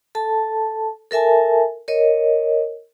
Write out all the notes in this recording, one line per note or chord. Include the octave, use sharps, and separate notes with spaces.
A4 A5
A4 A#4 E5 G#5 A5
A#4 C#5 D#5